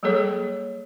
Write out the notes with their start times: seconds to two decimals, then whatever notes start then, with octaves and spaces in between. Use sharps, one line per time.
0.03 F#3 G3 A#3 G#4 A4 C#5